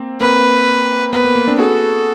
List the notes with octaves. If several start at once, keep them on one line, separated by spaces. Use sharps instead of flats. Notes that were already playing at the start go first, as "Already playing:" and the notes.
Already playing: A#3 C4
A#3 C4 B4
B3 B4
A#3
A#3
C4 D4
F#4 G#4 A4